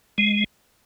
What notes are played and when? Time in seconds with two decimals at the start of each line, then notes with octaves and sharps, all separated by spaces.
0.18 G#3